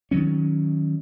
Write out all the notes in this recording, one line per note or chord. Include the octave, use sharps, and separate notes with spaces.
D#3 F3 F#3 C#4